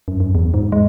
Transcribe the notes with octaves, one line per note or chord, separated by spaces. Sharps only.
F#2
F#2
E2
G#2
G#3